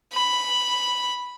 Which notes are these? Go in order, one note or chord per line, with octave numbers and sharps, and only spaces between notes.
B5